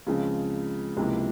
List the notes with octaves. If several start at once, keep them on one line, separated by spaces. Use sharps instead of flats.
C#2 C#3 F3 G#3 C4
C#2 C3 F3 A#3 E4